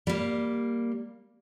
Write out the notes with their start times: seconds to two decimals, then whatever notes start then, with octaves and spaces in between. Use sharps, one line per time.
0.07 G3 A#3